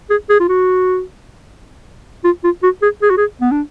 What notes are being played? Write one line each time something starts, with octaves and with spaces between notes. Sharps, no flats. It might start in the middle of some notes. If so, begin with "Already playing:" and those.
G#4
G#4
F4
F#4
F4
F4
F#4
G#4
G#4
F#4
G#4
B3
D4